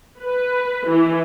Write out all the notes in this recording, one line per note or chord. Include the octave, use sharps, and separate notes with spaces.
B4
E3